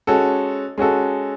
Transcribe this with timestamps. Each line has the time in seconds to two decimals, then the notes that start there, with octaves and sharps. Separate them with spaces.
0.07 G#3 C#4 F#4 A4
0.78 G#3 C#4 F#4 A4